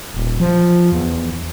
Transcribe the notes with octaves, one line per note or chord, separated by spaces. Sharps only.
D#1
F3
E2